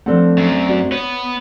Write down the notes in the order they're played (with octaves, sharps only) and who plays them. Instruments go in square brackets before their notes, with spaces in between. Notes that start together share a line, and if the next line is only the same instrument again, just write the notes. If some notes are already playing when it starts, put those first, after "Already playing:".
[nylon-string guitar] F3 A4 F#5 [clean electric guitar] A3 C4 D4
[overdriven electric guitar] F#2
[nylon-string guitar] F#4 D5
[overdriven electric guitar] B3 [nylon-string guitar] C#5